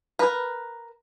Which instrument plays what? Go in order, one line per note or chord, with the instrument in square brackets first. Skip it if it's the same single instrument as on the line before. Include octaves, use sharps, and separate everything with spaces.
[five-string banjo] A#4 B4